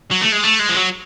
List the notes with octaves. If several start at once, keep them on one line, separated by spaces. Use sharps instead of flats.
F#3
A3
G#3
A3
G#3
F3
F#3